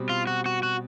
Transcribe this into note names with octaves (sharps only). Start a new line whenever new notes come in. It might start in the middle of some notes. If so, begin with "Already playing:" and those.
Already playing: B2 G3 C4
F4
F#4
F#4
F#4